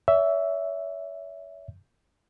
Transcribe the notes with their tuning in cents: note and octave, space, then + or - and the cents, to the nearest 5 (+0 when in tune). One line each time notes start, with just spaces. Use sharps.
C#5 +40 E5 +0